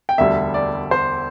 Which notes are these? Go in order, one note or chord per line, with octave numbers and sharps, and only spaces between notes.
G5
E1 D2 D3 G3 E5
D5
C5